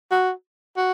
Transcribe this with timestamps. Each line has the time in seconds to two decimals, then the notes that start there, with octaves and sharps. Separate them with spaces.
0.11 F#4
0.77 F#4